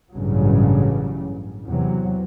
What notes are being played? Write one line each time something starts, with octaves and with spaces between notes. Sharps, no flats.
A1 G2 C#3 F#3
E2 C3 F#3